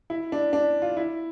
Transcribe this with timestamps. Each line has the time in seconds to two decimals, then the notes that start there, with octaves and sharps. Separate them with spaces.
0.10 E4
0.32 D4
0.53 D4
0.82 F4
0.97 E4